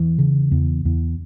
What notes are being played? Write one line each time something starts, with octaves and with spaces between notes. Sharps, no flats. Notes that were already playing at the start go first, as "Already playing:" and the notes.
Already playing: E2 E3
C#3
E2
E2